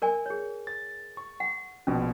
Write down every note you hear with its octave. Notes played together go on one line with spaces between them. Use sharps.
A#4 D5 G#5
G#4 C#5
A6
C#6
F#5
A#1 B2 C#4